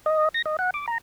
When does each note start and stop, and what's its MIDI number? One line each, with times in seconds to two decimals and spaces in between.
0.06 0.29 75
0.34 0.42 94
0.46 0.56 75
0.59 0.70 78
0.74 0.86 86
0.87 0.98 82